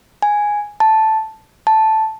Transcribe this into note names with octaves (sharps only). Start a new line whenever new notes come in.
G#5
A5
A5